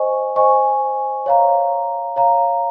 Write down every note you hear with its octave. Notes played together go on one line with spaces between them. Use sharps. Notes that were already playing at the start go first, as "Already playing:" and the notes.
Already playing: C5 D#5 G#5 C#6
C5 D#5 G#5 C#6
C#5 F5 A#5
C#5 F5 A#5